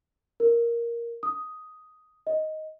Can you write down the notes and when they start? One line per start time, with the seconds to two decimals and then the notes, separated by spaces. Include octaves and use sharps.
0.40 A#4
1.23 D#6
2.27 D#5